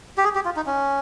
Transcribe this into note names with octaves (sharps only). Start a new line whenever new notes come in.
G4
G#4
G4
F4
D#4
C#4